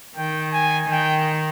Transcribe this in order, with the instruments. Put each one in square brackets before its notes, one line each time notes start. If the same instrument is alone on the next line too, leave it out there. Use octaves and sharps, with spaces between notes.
[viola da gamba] D#3 [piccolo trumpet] G5
[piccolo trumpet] G#5
[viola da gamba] D#3 [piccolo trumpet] G5